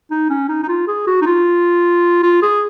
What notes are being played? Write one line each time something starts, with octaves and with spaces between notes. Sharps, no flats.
D#4
C#4
D#4
D#4
F4
G#4
F#4
D#4
F4
F4
G#4